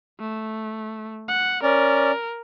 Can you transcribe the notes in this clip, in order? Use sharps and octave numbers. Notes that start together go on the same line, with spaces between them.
A3
F#5
C#4 A#4 D5